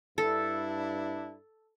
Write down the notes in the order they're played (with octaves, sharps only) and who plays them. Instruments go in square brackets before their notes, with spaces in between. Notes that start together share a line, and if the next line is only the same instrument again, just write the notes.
[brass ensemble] G2 D4 E4 [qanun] A4